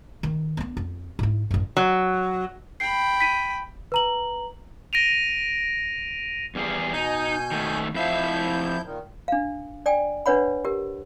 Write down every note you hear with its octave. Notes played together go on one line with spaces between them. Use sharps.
D#3
B3 D4
F2
G#2 E4
A1 F#2
F#3
G5 B5 C7
B6 D#7
B4 A#5 F#7
A#6 D7 D#7 F7
E2 G3 G#4
B2 D#4 G#5 G6
D#3 A3
F2 F3 E4 E5 F5 G6
A#2 D#3
D4 F5
D5 G5 G#5
D4 B4 C#5 F#5 B5
G4 A#4